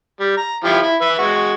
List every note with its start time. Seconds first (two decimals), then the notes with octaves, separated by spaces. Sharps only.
0.20 G3
0.37 A#5
0.64 F3 E4 G4
0.83 E4
1.01 B4 E5
1.19 G#3 F#4